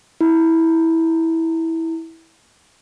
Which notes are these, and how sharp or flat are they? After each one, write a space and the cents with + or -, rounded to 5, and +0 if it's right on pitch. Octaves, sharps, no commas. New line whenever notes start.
E4 -15